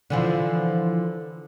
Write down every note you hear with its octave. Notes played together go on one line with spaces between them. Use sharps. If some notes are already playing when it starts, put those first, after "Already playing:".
D3 E3 F3